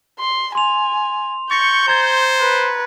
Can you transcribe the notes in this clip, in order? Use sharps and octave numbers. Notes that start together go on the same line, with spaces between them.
C6
G#5 C6 F7
C#6 G6 A6 A#6 C#7
C5 A#5 G#6 A6
B4